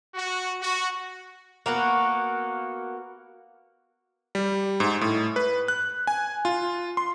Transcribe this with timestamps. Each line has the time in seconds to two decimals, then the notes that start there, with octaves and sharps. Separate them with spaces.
0.14 F#4
0.61 F#4
1.66 A#3 B3 F#4
4.35 G3
4.80 G#2
5.01 A2
5.36 B4
5.68 F#6
6.07 G#5
6.45 F4
6.97 C6